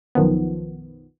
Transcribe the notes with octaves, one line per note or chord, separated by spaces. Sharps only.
B1 F#2 D#3 F3 B3